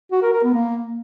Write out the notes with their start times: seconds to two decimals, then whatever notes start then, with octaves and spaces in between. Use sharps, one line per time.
0.11 F#4
0.22 A#4
0.33 A#4
0.43 B3
0.54 A#3